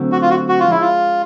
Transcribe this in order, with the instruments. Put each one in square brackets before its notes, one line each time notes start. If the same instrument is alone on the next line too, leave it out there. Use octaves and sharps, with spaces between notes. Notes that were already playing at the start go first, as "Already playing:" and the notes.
Already playing: [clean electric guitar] D3 F#3 A3 C4
[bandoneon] F#4
F4
F#4
F#4
F4
[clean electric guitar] F3 G#3 C#4 [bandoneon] E4
[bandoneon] F4